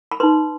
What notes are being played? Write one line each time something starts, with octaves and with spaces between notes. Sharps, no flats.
B5
D#4 B4 C6